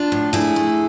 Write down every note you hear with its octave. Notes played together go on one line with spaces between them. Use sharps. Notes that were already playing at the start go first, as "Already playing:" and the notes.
Already playing: D4 F4
A2
A3 E4 G#4
A3